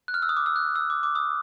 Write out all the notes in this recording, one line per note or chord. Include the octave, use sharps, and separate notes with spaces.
F#6
F6
E6
D#6
D6
E6
F#6
E6
D6
D6
D#6